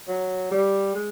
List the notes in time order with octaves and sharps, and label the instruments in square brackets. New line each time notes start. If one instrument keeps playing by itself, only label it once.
[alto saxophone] F#3
G3
G#3